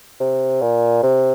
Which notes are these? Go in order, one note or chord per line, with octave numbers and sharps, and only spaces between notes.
C3
A#2
C3